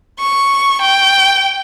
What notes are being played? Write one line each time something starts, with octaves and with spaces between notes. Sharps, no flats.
C#6
G5